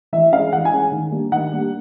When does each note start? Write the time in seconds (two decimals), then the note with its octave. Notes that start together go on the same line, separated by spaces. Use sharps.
0.13 E3 E5
0.33 G#3 C#4 F5
0.53 E3 F#5
0.65 G#5
0.72 G#3 C#4
0.92 D#3
1.12 G3 A#3 D4
1.32 D#3 F#5
1.52 G3 A#3 D4